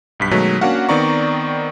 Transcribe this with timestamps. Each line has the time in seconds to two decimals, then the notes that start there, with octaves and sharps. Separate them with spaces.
0.20 B1 G2 B6
0.31 B2 D#3 F#3 G#3 A3
0.61 A#3 C#4 D4 F#4 F5 F#5
0.89 D#3 B3 C4 D5 A#5 C#6